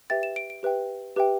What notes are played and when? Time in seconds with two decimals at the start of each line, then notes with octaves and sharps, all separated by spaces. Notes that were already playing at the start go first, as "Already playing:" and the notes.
0.10 G4 B4 E5 G5 A6
0.23 E7
0.36 D7
0.50 D7
0.63 G4 B4 E5 G5
1.16 G4 B4 E5 G5